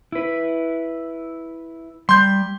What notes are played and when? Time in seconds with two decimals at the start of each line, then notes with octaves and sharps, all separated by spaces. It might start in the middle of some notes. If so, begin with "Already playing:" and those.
0.12 E4 B4
2.09 G3 C6 G6